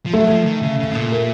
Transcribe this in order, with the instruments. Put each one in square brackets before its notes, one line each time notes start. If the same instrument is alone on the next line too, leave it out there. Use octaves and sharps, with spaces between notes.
[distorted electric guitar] F3
[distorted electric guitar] F#3 [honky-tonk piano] A3
[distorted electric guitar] F3
D#3
C#3
C#3
A2
A#2
[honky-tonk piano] A#3